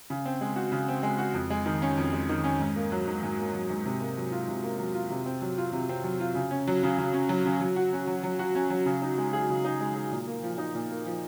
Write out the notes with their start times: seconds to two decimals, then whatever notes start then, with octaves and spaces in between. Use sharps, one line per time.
0.10 C#3
0.26 C4
0.41 G#3
0.56 F#4
0.72 C#3
0.88 C4
1.03 G#3
1.18 F#4
1.34 F2
1.50 G#3
1.66 D#3
1.82 C#4
1.97 F2
2.13 G#3
2.29 D#3
2.44 C#4
2.61 G#2
2.76 A#3
2.92 F#3
3.08 G#2
3.23 G#2
3.39 A#3
3.53 F#3
3.70 G#2
3.85 C3
4.01 A#3
4.17 F#3
4.32 F4
4.48 C3
4.63 A#3
4.79 F#3
4.95 F4
5.10 C3
5.26 C4
5.42 F#3
5.58 F4
5.73 C3
5.89 C4
6.04 F#3
6.20 F4
6.35 C#3
6.51 C#4
6.67 F#3
6.83 C#3
6.98 C#3
7.14 C#4
7.29 F#3
7.46 C#3
7.61 F#3
7.76 F#4
7.93 C#4
8.07 F#3
8.23 F#3
8.39 F#4
8.55 C#4
8.70 F#3
8.86 C#3
9.02 D#4
9.18 G#3
9.33 G#4
9.50 C#3
9.65 D#4
9.81 G#3
9.96 G#4
10.12 A#2
10.27 A#3
10.43 F3
10.58 D#4
10.75 A#2
10.90 A#3
11.06 F3